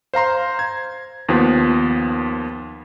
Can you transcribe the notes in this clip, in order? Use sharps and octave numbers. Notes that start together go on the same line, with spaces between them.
C5 F5 A#5 C6
G#6
D#2 F3 B3